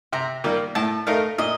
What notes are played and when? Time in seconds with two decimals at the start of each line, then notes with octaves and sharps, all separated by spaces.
0.13 C3 A#5
0.44 D#3 G3 A#3 F4
0.75 A2 A5
1.07 A3 D#4 A#4 F5
1.38 A#2 D#5